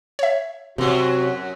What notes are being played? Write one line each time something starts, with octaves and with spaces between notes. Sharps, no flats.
C#5 E5
F#2 C3 F#3 F#4